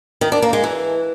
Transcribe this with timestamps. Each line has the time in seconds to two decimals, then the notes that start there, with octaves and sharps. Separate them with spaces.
0.21 D#3
0.32 D4
0.42 A#3
0.53 G#3
0.64 E3